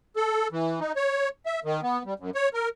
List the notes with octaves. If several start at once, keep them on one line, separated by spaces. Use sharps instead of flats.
A4
E3
D#4
C#5
E5
D#3
B3
G3
F#2
C#5
A#4